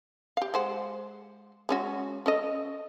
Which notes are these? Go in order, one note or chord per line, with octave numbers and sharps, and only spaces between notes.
G4 F5
G#3 C5 F#5
G#3 C#4 F#4
C#4 A4 D#5